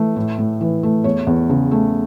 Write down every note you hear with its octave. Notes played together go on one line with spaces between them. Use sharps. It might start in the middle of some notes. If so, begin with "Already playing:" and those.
Already playing: E3 A3
A2
A2
E3
A3
E2 C#5
E2
C#3
A3